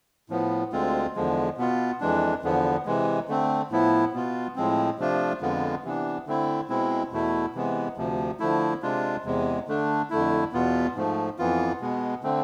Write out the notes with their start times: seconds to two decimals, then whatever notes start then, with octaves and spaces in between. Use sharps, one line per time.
0.30 A2 F3 B3
0.72 D2 D3 G#3 C4 F4
1.15 E2 D3 F3 G#3
1.58 B2 B3 F4
2.01 F2 E3 G#3 D4
2.43 E2 D3 F3 B3
2.86 C3 E3 G#3
3.28 D3 A3 C4
3.71 A2 F3 B3 E4
4.13 B2 B3 F4
4.56 A2 F3 G#3 C4
4.99 C3 F3 A3 D4 F4
5.41 F2 D3 G#3 B3 F4
5.84 C3 E3 B3 D4
6.27 D3 A3 C4 E4
6.69 B2 G#3 C4 E4
7.12 E2 B2 A3 E4
7.54 C3 E3 G#3 B3
7.97 D2 C3 F3
8.40 D3 F3 A3 E4
8.82 C3 G#3 D4 F4
9.25 E2 C3 G#3
9.68 D3 A3 D4
10.10 F2 D3 A3 E4
10.53 E2 B2 B3 F4
10.95 G#2 F3 A3
11.39 F2 E3 B3 F4
11.81 B2 G#3 B3
12.23 D3 A3 C4